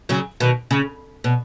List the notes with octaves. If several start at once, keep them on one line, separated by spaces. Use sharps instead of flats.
C#3 F#3
B2 D#3
C#3
B2